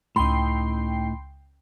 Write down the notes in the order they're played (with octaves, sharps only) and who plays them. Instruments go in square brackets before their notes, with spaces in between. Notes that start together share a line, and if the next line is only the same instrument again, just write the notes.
[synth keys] C#2 G5 C7 [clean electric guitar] A2 D#4 [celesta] B5 C6